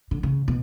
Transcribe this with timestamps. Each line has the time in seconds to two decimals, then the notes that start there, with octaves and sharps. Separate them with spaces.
0.11 D3
0.23 C#3
0.48 B2